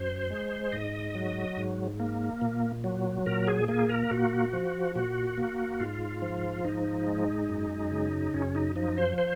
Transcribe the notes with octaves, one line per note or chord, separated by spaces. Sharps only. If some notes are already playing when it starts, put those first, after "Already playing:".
Already playing: F#2 C5
G#3
G#2 D#5
F#3
G#2
A#3
A#2
F#3
A#2 A#4
G#4
A#3 G#4
A#4
A#2 F#4
F3
A#2 F#4
A#3
G#2 F4
F3
G#2 D#4
G#3
F#2
C#3
F#2 C#4
D#4
F3 D#4
C5
C5